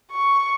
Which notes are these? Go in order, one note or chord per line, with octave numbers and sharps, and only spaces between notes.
C#6